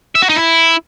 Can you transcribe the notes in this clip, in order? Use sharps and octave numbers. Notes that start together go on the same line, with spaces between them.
E5
F#4
D#4
E4